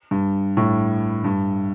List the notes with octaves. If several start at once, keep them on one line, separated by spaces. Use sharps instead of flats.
G2
A2
G2